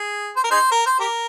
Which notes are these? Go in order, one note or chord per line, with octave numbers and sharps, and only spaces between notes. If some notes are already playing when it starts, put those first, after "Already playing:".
Already playing: G#4
C5
A#4
D#4 G#4 C5
A#4
C5
G4 A#4